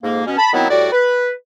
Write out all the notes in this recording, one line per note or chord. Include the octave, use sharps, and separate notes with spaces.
F2 G#2 A#3
B2 C#4
A5 B5
D#3 F#3 B3 C4 E4
A2 G3 F#4 D5
B4